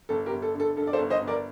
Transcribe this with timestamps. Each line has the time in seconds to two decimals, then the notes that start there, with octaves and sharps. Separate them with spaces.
0.09 G1 A4
0.26 G4 A#4
0.31 G1
0.42 A4
0.55 D3 A4
0.76 G2 A4
0.87 D5
0.93 A4 C5
0.99 G1
1.10 C5 D#5
1.21 G1
1.27 A#4 D5